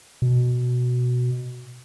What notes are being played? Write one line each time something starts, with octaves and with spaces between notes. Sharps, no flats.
B2